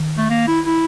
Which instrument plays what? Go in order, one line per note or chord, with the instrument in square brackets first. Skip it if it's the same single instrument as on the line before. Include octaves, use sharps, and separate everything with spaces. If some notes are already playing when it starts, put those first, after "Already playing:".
Already playing: [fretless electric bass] D#3
[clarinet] A3
A#3
E4
E4